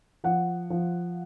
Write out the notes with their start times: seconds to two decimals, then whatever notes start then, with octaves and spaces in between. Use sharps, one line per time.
0.24 F3 F#5
0.70 F3